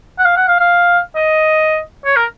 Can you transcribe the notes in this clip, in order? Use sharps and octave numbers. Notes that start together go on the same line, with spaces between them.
F#5
F5
F#5
F5
F5
D#5
C#5
A#4